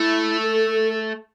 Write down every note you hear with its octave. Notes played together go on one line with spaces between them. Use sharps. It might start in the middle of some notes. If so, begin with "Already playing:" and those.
Already playing: A3 E4
A4